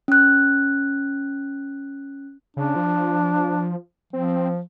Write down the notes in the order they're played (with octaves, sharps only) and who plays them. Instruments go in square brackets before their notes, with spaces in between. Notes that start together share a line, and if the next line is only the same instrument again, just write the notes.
[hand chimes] C#4 F#6
[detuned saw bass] C#3 [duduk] D4
[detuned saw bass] F3
[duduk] F3 [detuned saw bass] C4